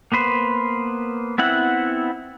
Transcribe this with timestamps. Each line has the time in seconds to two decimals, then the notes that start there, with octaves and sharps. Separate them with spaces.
0.12 A#3 B3 B4 C5
1.38 B3 C4 E4 F#5